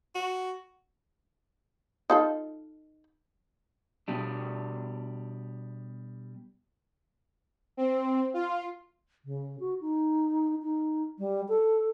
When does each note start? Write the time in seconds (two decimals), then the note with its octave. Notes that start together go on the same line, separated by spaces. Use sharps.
0.15 F#4
2.10 D#4 F4 A4
4.08 B2 G3 D4
7.77 C4
8.34 F4
9.25 C#3
9.60 F#4
9.81 D#4
10.62 D#4
11.19 G3
11.49 A4